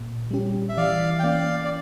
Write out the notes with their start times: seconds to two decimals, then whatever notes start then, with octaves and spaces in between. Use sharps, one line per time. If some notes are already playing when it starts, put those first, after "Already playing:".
Already playing: A#2
0.31 G3 C#4 G4
0.69 E5
0.77 E3 D5 F5
1.19 G5
1.23 A#3 C#4 D5 F5
1.64 D5